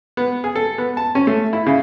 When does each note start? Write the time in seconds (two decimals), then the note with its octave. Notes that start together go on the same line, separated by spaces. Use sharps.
0.17 B3
0.44 G#4
0.56 A4
0.78 B3
0.97 A5
1.15 C#4
1.27 A3
1.53 E4
1.66 C#3